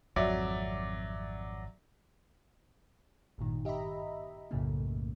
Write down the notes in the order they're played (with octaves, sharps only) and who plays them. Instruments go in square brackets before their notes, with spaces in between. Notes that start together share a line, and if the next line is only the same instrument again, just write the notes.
[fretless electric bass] G#1 F2 [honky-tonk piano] F#3 D5 E5
[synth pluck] G#1 G2 A#2 D#3
G4 D#5 E5 A#5 B5
B1 F#2 A2 C#3 A3 A#3